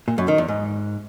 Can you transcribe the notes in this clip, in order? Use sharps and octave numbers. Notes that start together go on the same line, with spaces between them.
A#2
F#2
D#3
E2
G#2